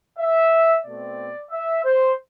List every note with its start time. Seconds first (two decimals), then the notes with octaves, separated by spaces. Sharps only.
0.19 E5
0.85 B2 A3 C4 D5
1.51 E5
1.84 C5